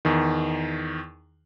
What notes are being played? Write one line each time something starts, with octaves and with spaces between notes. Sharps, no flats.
E2 D#3